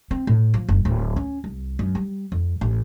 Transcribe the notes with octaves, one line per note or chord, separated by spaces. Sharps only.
C4
A2
F3
F#1
D1
C#4
C2
F#2
G3
F2
A1